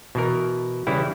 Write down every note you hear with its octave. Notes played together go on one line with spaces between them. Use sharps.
B2 E3 A#4
C#3 E3 G3 E4